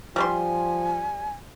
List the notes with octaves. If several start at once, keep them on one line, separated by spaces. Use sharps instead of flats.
F3 G3 B4 G#5 C6